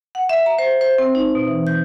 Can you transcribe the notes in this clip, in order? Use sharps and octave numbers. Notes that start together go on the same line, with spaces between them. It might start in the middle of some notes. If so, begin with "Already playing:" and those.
F#5
E5
A#5
C5
C5
C4
D#4
B2
E3
G6